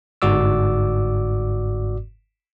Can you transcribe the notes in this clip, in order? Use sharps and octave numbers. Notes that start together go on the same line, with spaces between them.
G1 G#2 F#4 D5 D6 E6